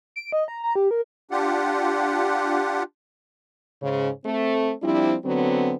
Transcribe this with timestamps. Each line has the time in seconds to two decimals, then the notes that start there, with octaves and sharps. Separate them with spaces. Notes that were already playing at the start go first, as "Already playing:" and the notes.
0.16 D7
0.32 D#5
0.48 A#5
0.63 A#5
0.76 G4
0.91 A#4
1.31 D4 F4 G4 F#5
3.81 G#2 C#3
4.25 A3 C4
4.82 F3 G3 C4 D4 E4
5.25 D3 F#3 B3 C4